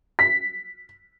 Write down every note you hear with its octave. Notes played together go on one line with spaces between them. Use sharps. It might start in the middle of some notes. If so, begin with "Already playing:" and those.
B6